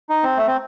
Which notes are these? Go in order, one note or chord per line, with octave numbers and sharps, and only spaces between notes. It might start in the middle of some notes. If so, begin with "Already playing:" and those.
D#4
C4
A3
C4